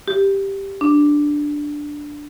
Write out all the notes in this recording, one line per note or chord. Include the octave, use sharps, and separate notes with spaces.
G4
D4